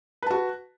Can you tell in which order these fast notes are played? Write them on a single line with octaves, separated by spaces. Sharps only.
B4 A5 F#4